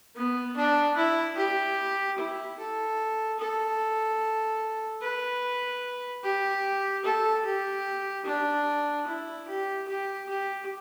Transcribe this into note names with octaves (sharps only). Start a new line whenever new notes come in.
B3
D4
E4
G4
E4
A4
A4
B4
G4
A4
G4
D4
E4
G4
G4
G4